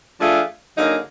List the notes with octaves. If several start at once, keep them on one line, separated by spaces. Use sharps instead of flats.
F3 A3 D4 F4 G#4
D3 F#3 A#3 D#4 G#4